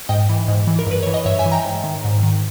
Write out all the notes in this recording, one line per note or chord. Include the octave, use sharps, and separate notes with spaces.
G#2 D#5 G5
E3
G#2
E3
A#4
G2 B4
E3 C#5
D#5
G2 C#5 E5
E5 G#5
E3
G5 A#5
G#2
D#3
G#2
D#3